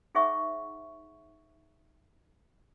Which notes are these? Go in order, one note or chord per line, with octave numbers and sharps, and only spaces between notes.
D#4 G#4 C5 E5 F#5 C#6